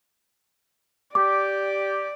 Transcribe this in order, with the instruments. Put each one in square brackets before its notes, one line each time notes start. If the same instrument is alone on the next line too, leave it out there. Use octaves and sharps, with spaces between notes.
[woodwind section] G4 [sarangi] D5 [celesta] D6